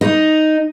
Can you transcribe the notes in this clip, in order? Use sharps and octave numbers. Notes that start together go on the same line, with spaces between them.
D#4